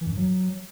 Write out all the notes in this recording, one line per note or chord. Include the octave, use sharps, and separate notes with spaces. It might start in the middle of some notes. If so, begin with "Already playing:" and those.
E3
F#2
G2
F#3